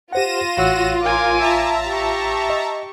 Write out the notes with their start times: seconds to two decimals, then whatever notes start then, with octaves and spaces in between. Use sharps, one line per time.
0.12 F4 G4 C5 F#5 A#6 D#7 E7
0.57 A1 F#4 C#5 E6
1.02 A#4 G#5 D6
1.38 E5 A5 A#5
1.87 G4 C#6
2.50 D#5